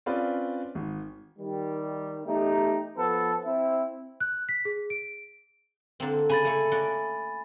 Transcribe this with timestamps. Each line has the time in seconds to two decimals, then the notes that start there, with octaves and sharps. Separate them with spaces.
0.06 C4 C#4 F4 B4 D5
0.75 G#1
1.39 D#3 G3
2.26 E2 A3 D#4 G4
2.96 F3 B3 A4 B4
3.46 C4 E4
4.20 F#6
4.49 B6
4.65 G#4
4.90 D7
6.00 D3 A#3 C4
6.30 C#3 G#5 B5 A6
6.45 A3 A#3 C#5
6.71 C#4 F#4 D5